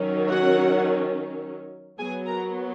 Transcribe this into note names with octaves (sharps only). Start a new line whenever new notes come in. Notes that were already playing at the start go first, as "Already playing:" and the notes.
Already playing: D#3 F#3 C#4
F#4 F#5
F#3 B3 G#4 G#5
A#4 A#5